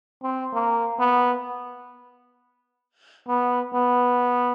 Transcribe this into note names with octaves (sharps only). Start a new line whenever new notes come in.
C4
A#3
B3
B3
B3